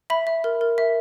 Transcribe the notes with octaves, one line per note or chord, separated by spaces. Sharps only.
E5 B5
E5
A#4
A#4
E5